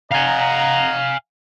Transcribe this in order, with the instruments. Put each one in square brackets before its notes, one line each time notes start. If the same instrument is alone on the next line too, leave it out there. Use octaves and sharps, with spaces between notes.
[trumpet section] D#5 F#5 A#5 [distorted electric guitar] F5 G#5